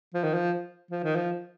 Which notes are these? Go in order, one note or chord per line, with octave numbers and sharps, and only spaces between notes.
F3
D#3
F3
F3
D#3
F3